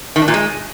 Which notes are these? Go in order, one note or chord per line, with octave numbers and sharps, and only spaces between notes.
D#3
D4
A#2
G#3